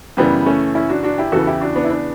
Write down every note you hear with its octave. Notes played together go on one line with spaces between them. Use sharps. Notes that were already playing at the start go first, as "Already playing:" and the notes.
F#2 C#3 E3 G3 B3
A3 C#4
C#4 E4
D4 F#4
D4 F#4
E4 G4
E2 C#3 E3 F#4 A4
E4 G4
D4 F#4
B3 D4
E4
B3 D4